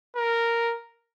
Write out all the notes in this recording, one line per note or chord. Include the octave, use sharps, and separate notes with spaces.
A#4